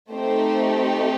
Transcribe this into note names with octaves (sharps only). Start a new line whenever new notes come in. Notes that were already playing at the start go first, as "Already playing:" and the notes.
A3 C4 D#4 G4 C5